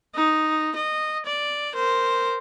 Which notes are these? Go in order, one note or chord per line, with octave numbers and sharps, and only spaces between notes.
D#4
D#5
D5
A#4 C5